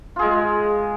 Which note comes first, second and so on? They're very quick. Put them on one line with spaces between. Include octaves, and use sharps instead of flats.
F4 G#4 G#3